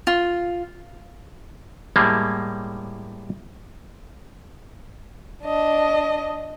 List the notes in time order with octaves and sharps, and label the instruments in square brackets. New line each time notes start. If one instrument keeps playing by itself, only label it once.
[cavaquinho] F4
[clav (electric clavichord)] A2 G3 G#3 A#3
[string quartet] D4 D#5